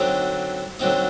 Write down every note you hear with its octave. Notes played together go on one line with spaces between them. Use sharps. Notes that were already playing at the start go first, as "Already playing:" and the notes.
Already playing: D3 F#3 C4 D#4
D3 F#3 C4 D#4